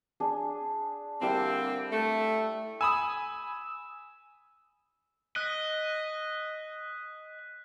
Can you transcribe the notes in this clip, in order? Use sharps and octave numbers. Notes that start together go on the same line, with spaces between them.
D4 G#4
D3 G3 A#3 C4 E4
A3
G#5 B5 D#6 E6 E7
D#5 F#6 B6